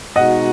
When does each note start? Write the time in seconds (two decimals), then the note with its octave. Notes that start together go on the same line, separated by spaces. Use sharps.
0.16 B2 G#3 D#4 F#4 D#5 F#5